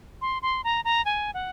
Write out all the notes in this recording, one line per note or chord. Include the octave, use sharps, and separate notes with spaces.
C6
C6
A#5
A#5
G#5
F#5